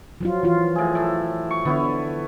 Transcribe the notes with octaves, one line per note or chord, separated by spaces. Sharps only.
F3 F#3 F4
E3 F3 F4
A2 G#4
A2 A4
C#6
D3 B3 E4 C#5